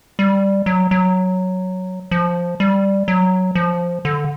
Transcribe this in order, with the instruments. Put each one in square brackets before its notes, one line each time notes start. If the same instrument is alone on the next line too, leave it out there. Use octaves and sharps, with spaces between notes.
[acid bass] G3
F#3
F#3
F3
G3
F#3
F3
D3